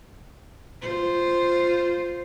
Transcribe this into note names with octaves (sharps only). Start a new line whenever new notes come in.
F4 C5